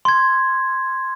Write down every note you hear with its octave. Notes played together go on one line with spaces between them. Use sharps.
C6 G#6